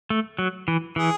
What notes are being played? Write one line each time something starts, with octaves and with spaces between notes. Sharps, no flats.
A3
F#3
E3
E3 G#4